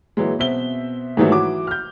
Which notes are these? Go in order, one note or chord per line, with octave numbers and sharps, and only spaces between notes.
A#2 E3 F#3 G#3
B2 C4 E5 G7
G#2 D#3 E3 F#3 G3 A3
E3 F#4 D6
F6 G6